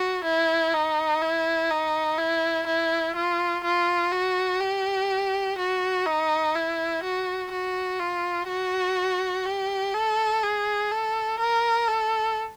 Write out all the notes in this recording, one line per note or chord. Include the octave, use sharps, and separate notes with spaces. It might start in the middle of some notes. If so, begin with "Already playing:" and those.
Already playing: F#4
E4
D#4
E4
D#4
E4
E4
F4
F4
F#4
G4
F#4
D#4
E4
F#4
F#4
F4
F#4
G4
A4
G#4
A4
A#4
A4